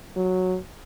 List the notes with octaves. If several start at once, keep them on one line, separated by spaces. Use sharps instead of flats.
F#3